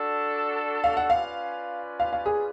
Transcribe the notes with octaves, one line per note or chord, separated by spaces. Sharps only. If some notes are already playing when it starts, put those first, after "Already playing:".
Already playing: D4 F#4 A4
F5
F#5
C#4 F4 B4 D5 F5
F5
F5
G#4